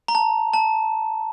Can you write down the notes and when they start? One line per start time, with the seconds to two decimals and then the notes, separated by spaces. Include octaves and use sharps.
0.08 A#5
0.15 A5
0.54 A5